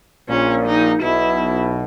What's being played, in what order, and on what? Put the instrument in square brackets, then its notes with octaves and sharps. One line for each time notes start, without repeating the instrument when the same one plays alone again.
[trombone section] A#1 A#2 [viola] C#4
[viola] D#4
[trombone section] B1 B2 [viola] E4